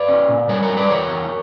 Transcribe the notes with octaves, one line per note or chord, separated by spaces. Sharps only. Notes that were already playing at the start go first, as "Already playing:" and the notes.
Already playing: B4 D5
C#4
A#2
G3 A#4 C#5
A#4 C#5
G3
B4 D5
E2 A#4 C#5
E2